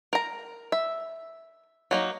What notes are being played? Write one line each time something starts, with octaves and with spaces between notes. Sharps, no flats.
A#4 A#5
E5
F#3 A#3 D#4